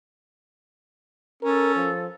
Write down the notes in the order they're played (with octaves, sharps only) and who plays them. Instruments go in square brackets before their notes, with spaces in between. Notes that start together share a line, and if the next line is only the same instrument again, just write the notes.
[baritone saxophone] C#4 [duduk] A4 [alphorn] A#4
[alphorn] F3